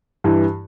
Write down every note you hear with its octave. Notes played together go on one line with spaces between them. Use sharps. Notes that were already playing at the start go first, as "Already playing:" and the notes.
G2 E3